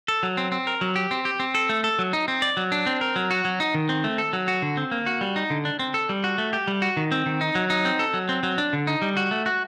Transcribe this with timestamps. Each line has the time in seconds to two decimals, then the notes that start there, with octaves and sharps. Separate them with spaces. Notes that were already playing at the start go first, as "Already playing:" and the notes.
0.08 A4
0.23 F#3
0.37 C4
0.52 C4
0.67 A#4
0.81 F#3
0.96 G4
1.11 C4
1.25 G4
1.40 C4
1.55 A4
1.69 A3
1.84 A4
1.99 F#3
2.13 D#4
2.28 C4
2.42 D5
2.57 F#3
2.72 D4
2.86 C4
3.01 A#4
3.16 F#3
3.31 F#4
3.45 F#3
3.60 D#4
3.74 D#3
3.89 C4
4.04 A3
4.18 A4
4.33 F#3
4.48 F#4
4.62 D3
4.77 C4
4.91 A#3
5.06 F#4
5.21 G3
5.36 D#4
5.50 D3
5.65 D4
5.79 C4
5.94 A4
6.09 G3
6.24 F#4
6.38 A3
6.53 G4
6.68 G3
6.82 F#4
6.97 D#3
7.12 C4
7.26 D#3
7.41 D#4
7.55 F#3
7.70 D#4
7.85 C4
7.99 A4
8.14 F#3
8.29 C4
8.43 F#3
8.58 D4
8.73 D3
8.87 D#4
9.02 G3
9.17 F#4
9.31 A3
9.46 F#4